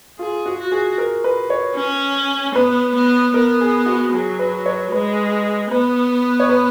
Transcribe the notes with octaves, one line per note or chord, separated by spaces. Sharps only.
F4 G#4
F#4
F#4
G#4
A#4
B4
C#5
C#4
B3 B4
B3
B3 A#4
G#4
F#4
F#3 G#4
B4
C#5
G#3 B4
B3 B4
C#5
B4